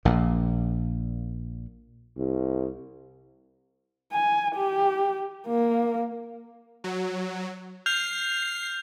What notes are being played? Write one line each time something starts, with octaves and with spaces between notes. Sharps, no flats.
A#1 A#2
C2
G#5
G4
A#3
F#3
F6 G6 C7 F7